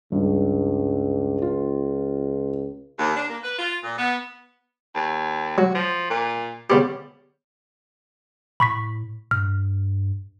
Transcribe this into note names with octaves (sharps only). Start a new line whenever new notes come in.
C#2 G2
F4
D#2
D4
A#3
B4
F4
A#2
B3
D#2
F#3 F#4
F3
A#2
C#3 G3 B3 G4
A2 B5 C#6 B6
G2 F6